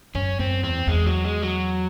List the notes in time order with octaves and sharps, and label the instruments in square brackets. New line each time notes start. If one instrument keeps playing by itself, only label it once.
[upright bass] F#2 [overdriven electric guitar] C#4
[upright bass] F#2 [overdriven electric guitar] C4
[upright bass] E2 [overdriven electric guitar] C4
[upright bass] E2 [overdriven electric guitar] G#3
[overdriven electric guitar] F#3
G#3
F#3